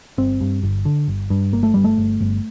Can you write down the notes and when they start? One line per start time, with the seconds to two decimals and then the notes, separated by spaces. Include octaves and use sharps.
0.18 G1 C4
0.41 G2
0.63 G1
0.85 D3
1.08 G1
1.30 G2
1.53 G1 A#3
1.63 A3
1.74 G1 G3
1.84 A3
1.98 G1
2.21 G1